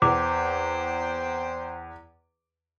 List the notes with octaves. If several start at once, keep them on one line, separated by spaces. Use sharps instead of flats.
E2 C5 G5 D6